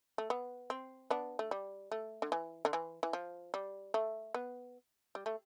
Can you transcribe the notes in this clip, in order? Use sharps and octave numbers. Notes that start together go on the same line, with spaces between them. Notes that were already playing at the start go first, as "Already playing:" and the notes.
A3
B3
C4
B3 D4
A3
G3
A3
D3
E3
D3
E3
E3
F3
G3
A3
B3
G3
A3